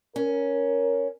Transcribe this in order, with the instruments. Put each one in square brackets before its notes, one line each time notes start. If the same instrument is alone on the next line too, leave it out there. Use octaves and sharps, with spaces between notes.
[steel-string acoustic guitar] C#4 [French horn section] A#4